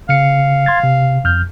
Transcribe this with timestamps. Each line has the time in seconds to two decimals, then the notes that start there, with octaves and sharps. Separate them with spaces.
0.09 C#3 F5 C#7
0.66 C6 G#6 A6
0.83 C3
1.24 F2 F6 G6